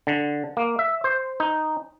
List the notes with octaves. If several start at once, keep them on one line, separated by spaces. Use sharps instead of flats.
D3
A#3
E5
C5
D#4